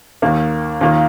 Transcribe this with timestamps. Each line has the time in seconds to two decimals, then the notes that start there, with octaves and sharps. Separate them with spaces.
0.22 D#2 D#3 A#3
0.81 D#2 D#3 A#3 F4 A#4